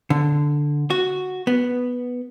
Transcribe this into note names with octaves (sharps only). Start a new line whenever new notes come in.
D3
F#4
B3